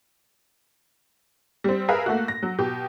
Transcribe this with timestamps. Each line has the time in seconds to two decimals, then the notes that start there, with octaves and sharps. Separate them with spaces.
1.64 G3 C4
1.88 G#4 A#4 B4 E5 F5
2.06 A3 A#3 F#4
2.28 A#6
2.43 F#3
2.58 B2 G4